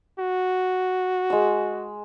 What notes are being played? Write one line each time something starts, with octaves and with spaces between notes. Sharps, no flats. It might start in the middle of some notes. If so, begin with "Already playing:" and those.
F#4
G#3 E6